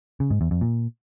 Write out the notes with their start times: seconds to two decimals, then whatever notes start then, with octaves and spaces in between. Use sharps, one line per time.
0.20 C#3
0.30 G#2
0.41 E2
0.51 F2
0.61 A#2